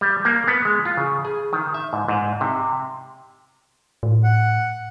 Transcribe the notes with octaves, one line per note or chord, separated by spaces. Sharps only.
G3
A#3
B3
G#3
F4
C#3
G#4
D#3
E5
G#2
G#2
C3
A2
F#5